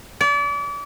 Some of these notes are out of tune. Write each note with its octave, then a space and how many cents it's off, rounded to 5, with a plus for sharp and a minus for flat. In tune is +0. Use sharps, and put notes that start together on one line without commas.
D5 -35